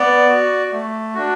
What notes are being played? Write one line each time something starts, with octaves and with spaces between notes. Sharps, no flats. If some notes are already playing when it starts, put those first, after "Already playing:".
Already playing: B3 D5
F#4
A3
D4 F#4